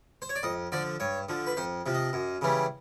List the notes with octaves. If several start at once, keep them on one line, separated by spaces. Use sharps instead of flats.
C5
C#5
D5
F2 D#5
D3 F3 D5
G2 C#5
D3 F3
B4
F2 C5
C3 F3
D#5
F#2
C#3 E3 G3